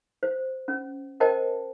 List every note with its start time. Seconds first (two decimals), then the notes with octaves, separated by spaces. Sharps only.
0.23 C5
0.68 C#4
1.20 A#4 C5 D#5 G5 A5